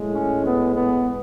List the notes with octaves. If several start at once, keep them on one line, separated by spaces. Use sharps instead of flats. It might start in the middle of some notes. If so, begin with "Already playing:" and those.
Already playing: A2 G#3
C#4
B3
B3